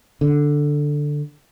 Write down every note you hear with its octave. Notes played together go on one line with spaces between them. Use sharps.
D3